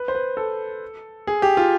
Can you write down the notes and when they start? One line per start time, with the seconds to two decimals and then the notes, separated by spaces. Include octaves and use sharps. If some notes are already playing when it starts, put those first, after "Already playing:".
Already playing: B4
0.08 C5
0.15 B4
0.37 A4
1.27 G#4
1.42 G4
1.57 F4